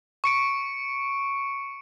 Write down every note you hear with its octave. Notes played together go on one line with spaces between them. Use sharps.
C#6 C#7 D7